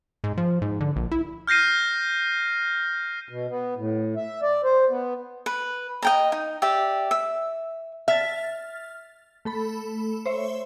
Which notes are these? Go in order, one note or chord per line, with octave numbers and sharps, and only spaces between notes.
G#2
F3
G#2
D3
A#1
E4
F6 G6 A#6 C7 D#7
B2
B3
A2
E5
D5
C5
B3
B4
D#5 G5 A#5
D#4
G4 D5 E5
E5
E5 F6 A6
A3 A4 B5
C5 C#5 E5